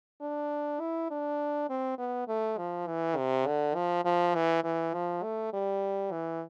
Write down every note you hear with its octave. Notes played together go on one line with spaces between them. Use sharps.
D4
E4
D4
C4
B3
A3
F3
E3
C3
D3
F3
F3
E3
E3
F3
A3
G3
E3